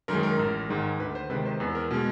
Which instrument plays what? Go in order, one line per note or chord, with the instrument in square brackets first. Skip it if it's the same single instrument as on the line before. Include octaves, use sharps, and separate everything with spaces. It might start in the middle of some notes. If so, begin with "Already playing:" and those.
[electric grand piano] F#2 D#3 G#3 A#4
A#4
A1
G#2 D#3 G#3
D2 B4
C5
C3 D#3 G#3 B4
C5
E2 B4
A#4
B2 G#3